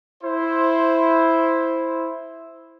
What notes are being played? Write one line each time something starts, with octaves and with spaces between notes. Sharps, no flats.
E4 C5